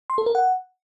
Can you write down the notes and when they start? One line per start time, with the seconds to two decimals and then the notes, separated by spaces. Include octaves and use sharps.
0.10 C6
0.18 A4
0.26 A#4
0.35 F#5